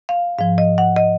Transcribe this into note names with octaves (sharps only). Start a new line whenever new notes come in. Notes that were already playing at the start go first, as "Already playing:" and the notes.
F5
G#2 F3 F5
D#5
F#5
D#5